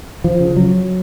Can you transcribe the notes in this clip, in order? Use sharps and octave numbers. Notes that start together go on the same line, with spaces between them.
F3
C#3
F#3